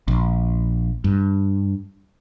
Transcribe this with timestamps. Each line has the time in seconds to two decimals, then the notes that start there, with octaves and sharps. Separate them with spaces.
0.08 A#1
1.04 G2